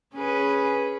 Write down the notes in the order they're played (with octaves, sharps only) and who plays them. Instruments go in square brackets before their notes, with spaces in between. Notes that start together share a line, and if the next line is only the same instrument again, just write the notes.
[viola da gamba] C#4 G#4 B4